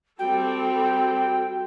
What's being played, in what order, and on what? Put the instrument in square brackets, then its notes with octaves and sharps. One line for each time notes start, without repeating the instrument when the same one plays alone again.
[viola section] G3 C4 A4 [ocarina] F#4 [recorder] G5